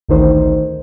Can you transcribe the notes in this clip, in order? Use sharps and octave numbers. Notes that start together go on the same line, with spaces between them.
A1 D2 D3 D#3 D#4 C5